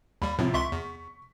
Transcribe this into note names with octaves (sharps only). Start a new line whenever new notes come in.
D#2 G3 B5
A2 C3 F3
C#2 E5 C6 C#6 B6
E2